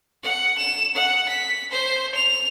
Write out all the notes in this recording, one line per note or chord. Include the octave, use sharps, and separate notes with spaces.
F#5
E7
F#5
B6
C5
F7